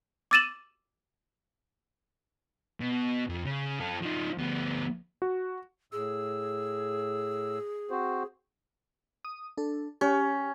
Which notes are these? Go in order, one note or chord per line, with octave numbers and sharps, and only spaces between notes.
D6 E6 A6 D#7 E7 F#7
B2
F2
C#3
F4 A4
F3 D#4
D2 B3
F#4
A2 G#4 E6
C4 F#4 C5
D#6
D4 A4
C#4 G4